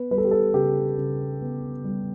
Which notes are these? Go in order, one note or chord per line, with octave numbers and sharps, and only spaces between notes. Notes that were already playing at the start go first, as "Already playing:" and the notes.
Already playing: B3 B4
G3 B4
A4
G4
A4
C#3 G4
C#3
B3
G3